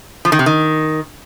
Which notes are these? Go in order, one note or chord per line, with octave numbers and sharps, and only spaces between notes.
F3
D#3
C3
D#3